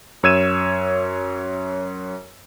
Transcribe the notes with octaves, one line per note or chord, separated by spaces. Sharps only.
F#2 C#5 E6 G#6 D#7 E7